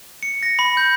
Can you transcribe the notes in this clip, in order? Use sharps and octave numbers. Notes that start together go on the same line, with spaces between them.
C#7
A#6
B5
G6